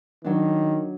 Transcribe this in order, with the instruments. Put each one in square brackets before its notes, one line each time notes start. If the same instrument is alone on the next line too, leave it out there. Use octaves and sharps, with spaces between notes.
[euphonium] D#3 [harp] F#3 D4